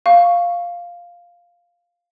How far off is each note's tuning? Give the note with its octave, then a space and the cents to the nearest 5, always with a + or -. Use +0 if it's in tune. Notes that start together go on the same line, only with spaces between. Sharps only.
F5 +0 C#6 +0